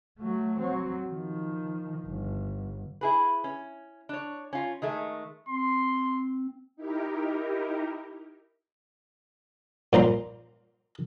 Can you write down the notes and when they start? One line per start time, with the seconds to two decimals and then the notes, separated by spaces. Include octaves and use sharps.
0.19 F#3 A3
0.59 F#3 C4
1.07 D#3 F3
2.07 G1
3.01 E4 G#4 B4
3.44 C#4
4.09 D4 C#5
4.53 C#4 F4
4.82 D#3 G#3 A3
5.49 C4 C6
6.76 D#4 E4 G4 A#4
9.93 A#2 C5 A#5 C6